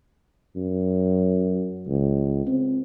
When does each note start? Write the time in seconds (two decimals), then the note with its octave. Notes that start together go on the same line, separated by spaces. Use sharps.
0.56 F#2
1.87 C#2
2.47 C4